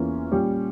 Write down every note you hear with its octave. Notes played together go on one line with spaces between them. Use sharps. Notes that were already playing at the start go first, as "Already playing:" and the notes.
Already playing: E2 E3 A#3 C#4 F4
A#2 G3 C#4 F4